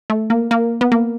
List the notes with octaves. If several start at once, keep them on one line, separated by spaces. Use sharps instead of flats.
A3
A#3
A#3
B3
A#3